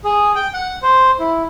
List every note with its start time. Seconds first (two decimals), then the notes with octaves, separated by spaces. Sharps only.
0.04 G#4
0.35 G5
0.54 F#5
0.82 C5
1.19 E4